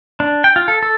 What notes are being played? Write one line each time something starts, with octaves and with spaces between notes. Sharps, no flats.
D4
G5
F4
A4
A4